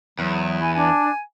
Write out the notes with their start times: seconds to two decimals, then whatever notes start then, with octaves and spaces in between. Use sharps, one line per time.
0.19 E2 F#3
0.61 E4 G#5
0.75 D4 G#5